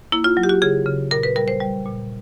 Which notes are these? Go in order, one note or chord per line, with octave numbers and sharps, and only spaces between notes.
A#3 E4
F4
F#3
G4
F#4
C#3 G#4
C#3
A#2 A#4
B4
G3 A#4
C5
G3
A#2